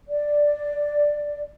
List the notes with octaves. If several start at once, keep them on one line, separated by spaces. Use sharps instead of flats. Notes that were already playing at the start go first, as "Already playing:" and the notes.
D5